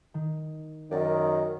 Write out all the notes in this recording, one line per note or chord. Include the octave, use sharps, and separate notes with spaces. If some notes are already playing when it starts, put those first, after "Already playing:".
D#3
F#2 D#3 D5